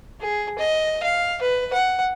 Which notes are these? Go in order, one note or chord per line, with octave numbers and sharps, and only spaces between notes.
G#4
D#5
F5
B4
F#5